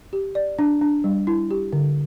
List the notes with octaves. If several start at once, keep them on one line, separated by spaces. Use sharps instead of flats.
G4
D5
D4
D4
G3
E4
G4
D3